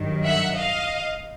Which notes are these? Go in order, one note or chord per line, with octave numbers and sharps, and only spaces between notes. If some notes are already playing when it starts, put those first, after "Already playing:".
Already playing: G2 D#3 F#3
E5 F#5
D#5 F5